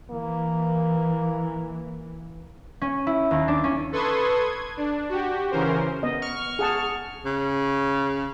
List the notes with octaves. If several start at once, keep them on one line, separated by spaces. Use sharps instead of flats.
E3 A#3
C#4
E4
D#2
D4
C#4
A4 B4 C6 C#6 D#6 G#6
G#6
D4
F#4 G4
C#3 E3 C#4 A#4 C5
B3 D#5
C#6 F6
G#4 F#5 A5
C#3